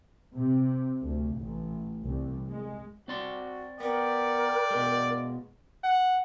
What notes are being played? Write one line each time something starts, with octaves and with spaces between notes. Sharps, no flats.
C3
D2
A1
C2
G#3
C4 F#4 D5 C6
B3 A#4 D5 G5
B2 G#3
F#5